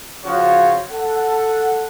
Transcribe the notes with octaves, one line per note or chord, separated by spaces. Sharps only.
C#3 F3 F#4 C#5
A4 F#5